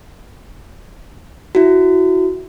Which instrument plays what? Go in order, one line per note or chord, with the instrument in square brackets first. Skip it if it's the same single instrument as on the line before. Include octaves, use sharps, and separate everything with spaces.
[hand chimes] E4 F#4